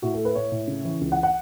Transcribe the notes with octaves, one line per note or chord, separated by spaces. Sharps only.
A2 F#4
A4
A3
B4
A2 C#5
A2
C#3
E3
C#2
F#5
F#5